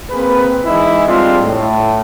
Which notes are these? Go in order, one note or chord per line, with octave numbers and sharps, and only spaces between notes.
A#3 C4 G#4 B4
E3 G#3 D#4 E4
F3 G3 G#3 C4 D4 F4
A2